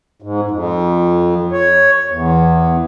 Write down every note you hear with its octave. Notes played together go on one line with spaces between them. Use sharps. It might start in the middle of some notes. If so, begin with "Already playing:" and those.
G#2
F2
C#5
E2